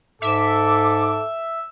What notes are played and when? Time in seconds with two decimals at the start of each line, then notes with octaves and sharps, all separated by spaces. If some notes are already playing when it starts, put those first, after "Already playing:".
0.22 G#2 A4 E5 D6